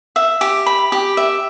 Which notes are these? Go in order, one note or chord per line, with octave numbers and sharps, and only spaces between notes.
E5
G4
B5
G4
E5